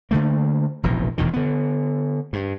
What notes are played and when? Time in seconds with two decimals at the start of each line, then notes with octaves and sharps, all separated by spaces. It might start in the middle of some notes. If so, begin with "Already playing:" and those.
0.11 D3 F#3 A3 A#3
0.83 F1 A#1 B2 E3
1.18 E1 E2 B2 D#3
1.33 D3 B3
2.33 G2